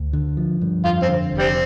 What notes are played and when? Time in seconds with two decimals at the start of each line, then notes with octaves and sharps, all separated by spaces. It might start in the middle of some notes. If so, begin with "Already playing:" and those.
Already playing: D2
0.13 D3
0.37 F3
0.61 G2
0.84 F2 F4
1.02 C4
1.08 D3
1.32 F1
1.39 G3 C4